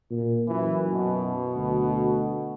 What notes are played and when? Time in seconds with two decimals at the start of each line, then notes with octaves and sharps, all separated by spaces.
0.11 A#2
0.48 F#2 E3
0.92 B2
1.56 D2